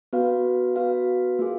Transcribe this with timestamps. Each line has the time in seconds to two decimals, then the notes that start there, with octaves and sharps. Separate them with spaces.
0.13 B3 F#4 B4 F5
0.76 B3 F#4 B4 F5
1.39 A#3 F4 G#4